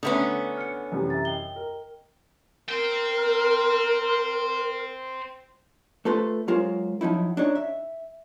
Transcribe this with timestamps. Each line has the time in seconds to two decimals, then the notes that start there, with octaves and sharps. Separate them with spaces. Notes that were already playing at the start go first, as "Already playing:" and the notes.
0.03 D3 A3 B3 C#4 E5 A#5 D#6
0.58 F6 C#7
0.92 F#2 C3 E3
1.10 E5 A#5 A6
1.25 D#5 G5 G7
1.56 A#4
2.69 A#4 C5 G5
6.05 A3 F4 A4 B4 C5
6.48 F#3 G#3 F4 A#4 C5
7.01 F3 F#3 D#4 E4
7.37 D4 D#4 C#5
7.55 E5